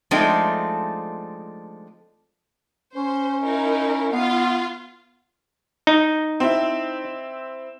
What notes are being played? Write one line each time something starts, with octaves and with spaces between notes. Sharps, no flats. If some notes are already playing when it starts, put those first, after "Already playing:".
F3 G#3 A3 C4 D4 D#4
C#4 C5
D#4 E4 A#4
B3 F4 F5
D#4
C4 E4